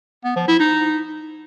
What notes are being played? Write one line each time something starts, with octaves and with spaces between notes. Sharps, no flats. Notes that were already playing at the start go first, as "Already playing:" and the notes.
B3
F3
E4
D#4